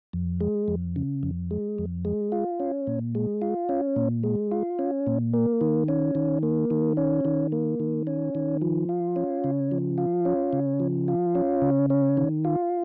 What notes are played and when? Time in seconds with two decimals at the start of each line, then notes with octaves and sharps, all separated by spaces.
0.13 F2
0.41 G#3
0.68 F2
0.96 C#3
1.23 F2
1.51 G#3
1.78 F2
2.05 G#3
2.32 F4
2.60 C#4
2.87 A#2
3.15 G#3
3.42 F4
3.69 C#4
3.96 A#2
4.23 G#3
4.51 F4
4.79 C#4
5.07 A#2
5.33 A#3
5.61 D#3
5.88 C#4
6.15 D#3
6.43 A#3
6.70 D#3
6.97 C#4
7.25 D#3
7.52 A#3
7.80 D#3
8.07 C#4
8.35 D#3
8.62 F3
8.89 F4
9.16 C#4
9.44 C#3
9.71 F3
9.98 F4
10.25 C#4
10.53 C#3
10.80 F3
11.08 F4
11.35 C#4
11.62 C#3
11.90 C#4
12.17 D#3
12.45 F4